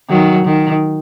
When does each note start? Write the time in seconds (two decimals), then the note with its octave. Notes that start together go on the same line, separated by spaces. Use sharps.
0.09 D#3 F#3
0.45 D#3